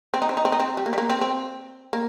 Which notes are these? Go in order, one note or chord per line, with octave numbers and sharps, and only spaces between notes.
C4
D#4
C4
D#4
C4
D#4
C4
G3
A#3
G3
A#3
C4
C4
A#3